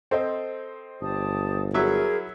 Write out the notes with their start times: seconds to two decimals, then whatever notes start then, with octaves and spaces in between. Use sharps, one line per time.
0.11 C4 A4 C5 D#5
1.01 G1 G4 A5 D#6
1.74 F#3 E4 F#4 G#4 A#4 E5 G#6